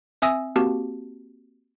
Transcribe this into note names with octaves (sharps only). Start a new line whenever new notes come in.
C4 E5 G#5 D#6 E6 A#6
A#3 C4 F#4 G4 A5